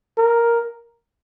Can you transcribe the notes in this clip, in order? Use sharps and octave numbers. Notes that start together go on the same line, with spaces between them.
A#4